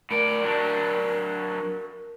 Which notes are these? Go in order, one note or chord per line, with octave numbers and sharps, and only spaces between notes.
A2 A#4 D5
F#3 D4